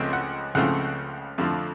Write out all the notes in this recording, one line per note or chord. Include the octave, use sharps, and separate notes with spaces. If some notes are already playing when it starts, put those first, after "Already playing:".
Already playing: C#2 C#3 F3 A3 C4
F#5
C#2 C#3 F3 A3 C4 F#5
F2 D3 F3 A3